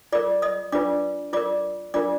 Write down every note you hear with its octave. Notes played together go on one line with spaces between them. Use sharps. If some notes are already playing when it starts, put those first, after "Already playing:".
F4 A#4 D5 D6
D#5 D#6
D4 F4 B4 D5 D6
F4 A#4 D5 D6
D4 F4 A#4 D5 D6